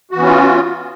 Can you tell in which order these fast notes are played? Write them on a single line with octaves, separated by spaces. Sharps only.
F#4 E3 B3 C#4 F4